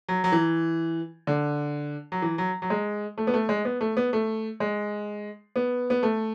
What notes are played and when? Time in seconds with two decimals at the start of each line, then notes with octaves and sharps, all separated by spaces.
0.08 F#3
0.24 F#3
0.32 E3
1.27 D3
2.12 F#3
2.22 E3
2.38 F#3
2.62 F#3
2.70 G#3
3.18 A3
3.27 B3
3.34 A3
3.49 G#3
3.65 B3
3.81 A3
3.97 B3
4.13 A3
4.60 G#3
5.56 B3
5.90 B3
6.03 A3